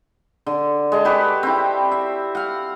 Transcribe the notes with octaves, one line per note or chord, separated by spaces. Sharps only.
D3
G#3 A5
F#4 G4 B4 F#5
C4 E4
E5
F5 F#5